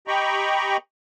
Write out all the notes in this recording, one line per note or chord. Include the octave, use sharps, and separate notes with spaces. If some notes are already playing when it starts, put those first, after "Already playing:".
G4 D#5 G5 A#5 B5 C#6